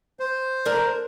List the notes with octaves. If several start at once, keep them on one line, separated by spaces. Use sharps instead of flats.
C5
D4 A#4